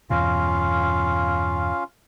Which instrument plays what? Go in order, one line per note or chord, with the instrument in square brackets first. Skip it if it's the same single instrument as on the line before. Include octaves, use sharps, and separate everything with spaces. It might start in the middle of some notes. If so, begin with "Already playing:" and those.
[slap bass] E2 G2 B2 [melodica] C#4 F4 F5